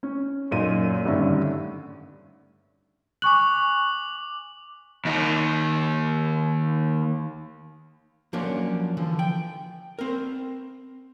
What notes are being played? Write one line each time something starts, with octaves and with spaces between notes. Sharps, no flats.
C#4
F#2 A#2 D#4 D#7
G#1 G2 D3 A3 C#4 E5
G#5 C#6 D6 F#6 F#7
D#2 D#4
F3 F#3 A#3 C#4 D4
D3 E3 F3
G5
C4 A#4